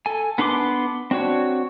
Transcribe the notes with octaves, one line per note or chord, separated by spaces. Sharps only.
A4 G#5
B3 D4 B4 C6 D6
C4 D4 F#4 C#5